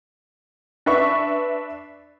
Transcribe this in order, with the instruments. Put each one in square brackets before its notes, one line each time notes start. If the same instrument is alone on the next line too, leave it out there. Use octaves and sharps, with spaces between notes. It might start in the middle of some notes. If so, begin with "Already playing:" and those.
[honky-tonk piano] D4 B4 E5 C#6